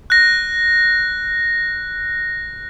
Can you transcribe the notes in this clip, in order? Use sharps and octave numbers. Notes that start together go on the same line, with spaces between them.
F#6 A#6